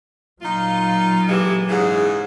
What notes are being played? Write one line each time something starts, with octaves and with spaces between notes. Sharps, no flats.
A#2 F#3 D#4 F4
A2 E3 G#3 G4
G#2 C#3 E3 G#4